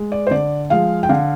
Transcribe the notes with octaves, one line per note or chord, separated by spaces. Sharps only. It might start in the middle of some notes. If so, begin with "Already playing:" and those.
Already playing: G#3
D5
C5
D3 D5
F3 G#3 F5
G5
D3 F5